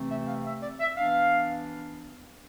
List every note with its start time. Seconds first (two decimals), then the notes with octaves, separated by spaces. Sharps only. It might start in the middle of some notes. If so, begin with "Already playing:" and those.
Already playing: C3 E3 A3 C4
0.09 E5
0.27 F5
0.44 E5
0.62 D5
0.80 E5
0.98 E3 B3 D4 F5